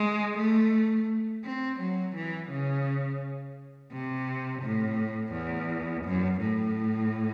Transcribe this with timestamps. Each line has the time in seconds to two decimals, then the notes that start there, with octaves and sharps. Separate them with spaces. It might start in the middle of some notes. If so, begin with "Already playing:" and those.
Already playing: G#3
0.39 A3
1.45 C4
1.80 F#3
2.15 E3
2.51 C#3
3.93 C3
4.64 A2
5.35 E2
6.06 F#2
6.41 A2